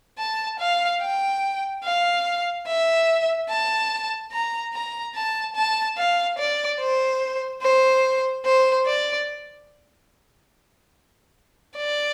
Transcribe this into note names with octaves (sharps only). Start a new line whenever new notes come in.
A5
F5
G5
F5
E5
A5
A#5
A#5
A5
A5
F5
D5
C5
C5
C5
D5
D5